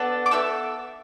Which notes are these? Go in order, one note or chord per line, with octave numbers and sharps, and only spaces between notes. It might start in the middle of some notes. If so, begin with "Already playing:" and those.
Already playing: B3 D4 A4
D6
B3 F#4 A4 E5 E6